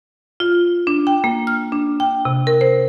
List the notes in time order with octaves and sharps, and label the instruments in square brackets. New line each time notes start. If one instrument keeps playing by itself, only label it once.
[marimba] F4
D4
G5
A#3
F6
D4
G5
C3
A#4
C5